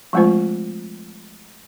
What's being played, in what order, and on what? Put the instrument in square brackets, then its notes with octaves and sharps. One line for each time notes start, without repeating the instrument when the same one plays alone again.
[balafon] F3 G#3 A3 C4 F4 C5